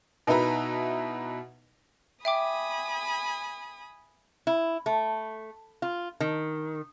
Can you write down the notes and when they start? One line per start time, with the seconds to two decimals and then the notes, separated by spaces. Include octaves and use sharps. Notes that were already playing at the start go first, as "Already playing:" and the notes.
0.27 B2 D#4 E4 B4 E5 A#5
2.25 E5 G5 G#5 B5 D6 D#6
4.47 E4
4.86 A3
5.82 F4
6.20 D#3